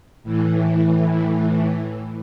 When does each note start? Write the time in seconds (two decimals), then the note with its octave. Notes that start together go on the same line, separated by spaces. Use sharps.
0.24 A2 E3